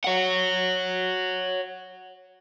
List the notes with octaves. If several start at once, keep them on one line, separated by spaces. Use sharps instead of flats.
C#5 F#5